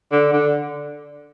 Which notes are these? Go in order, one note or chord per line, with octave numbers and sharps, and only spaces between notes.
D3
D3